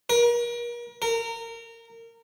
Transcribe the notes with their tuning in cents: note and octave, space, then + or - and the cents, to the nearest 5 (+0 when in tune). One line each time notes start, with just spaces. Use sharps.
A#4 +35
A#4 -25